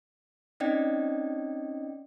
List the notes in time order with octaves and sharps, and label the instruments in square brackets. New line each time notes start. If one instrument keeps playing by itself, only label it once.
[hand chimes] C4 C#4 D#4 D5 D#5 G5